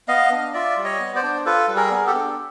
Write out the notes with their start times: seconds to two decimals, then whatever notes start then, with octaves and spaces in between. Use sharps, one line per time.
0.08 B3 D#5 F5
0.32 D4
0.54 F4 D5 E5
0.77 G3
0.84 C#5 D#5
1.00 B3
1.15 C5 D5
1.23 D4
1.46 F4 A4 B4
1.68 G3
1.76 G#4 A#4
1.91 B3
2.07 G4 A4
2.14 D4